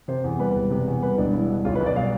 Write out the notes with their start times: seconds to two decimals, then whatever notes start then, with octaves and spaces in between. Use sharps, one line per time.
0.08 C3 C5
0.24 E2
0.39 G3 B4
0.55 E1
0.71 C3
0.87 E2
1.02 G3 B4
1.18 E1 D4
1.33 G3 E4
1.49 B2
1.65 B1 F4
1.75 B4
1.80 B1
1.86 D5
1.96 G3 F5